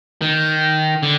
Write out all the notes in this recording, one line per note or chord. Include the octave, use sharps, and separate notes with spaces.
D#3
D3